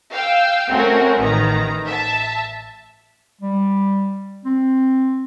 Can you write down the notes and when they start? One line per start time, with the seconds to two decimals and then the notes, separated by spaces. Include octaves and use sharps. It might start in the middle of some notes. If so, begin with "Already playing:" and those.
0.12 F5 G5 E6
0.70 A3 C4 C#4 F#4 A#4
1.20 A1 D#3 B4 A#5
1.86 E5 A5
3.41 G3
4.45 C4